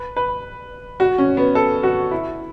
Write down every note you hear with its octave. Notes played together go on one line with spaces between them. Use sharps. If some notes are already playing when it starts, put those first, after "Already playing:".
Already playing: B4
B4
F#4
C#4
B3
A4
F#4
E4